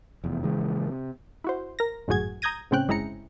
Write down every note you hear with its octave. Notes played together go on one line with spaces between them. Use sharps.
F1 E2
A#1 C#3 E3 G#3
C3
E4 F#4 C5
A#4 A#6
G#1 F#2 A2 F#4 G#4 G#6
A#5 D#6 G6 G#6 A#6 D#7
A2 C#3 C4 C#4 G5 F#6
G1 G#3 E4 G#4 A#5 C#7